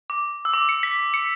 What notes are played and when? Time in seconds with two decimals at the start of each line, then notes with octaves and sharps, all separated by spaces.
0.10 D6
0.45 E6
0.53 D6
0.69 C#7
0.83 B6
1.14 C#7